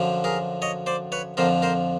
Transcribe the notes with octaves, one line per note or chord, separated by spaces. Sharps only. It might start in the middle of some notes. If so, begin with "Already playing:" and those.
Already playing: F#2 D3 F3
G#4 A#4
C#5 D#5
C5 D5
B4 C#5
F2 D3 F3 A#4 C5
A#4 C5